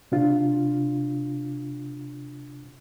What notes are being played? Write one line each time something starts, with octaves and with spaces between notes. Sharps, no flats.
C3 D4 F4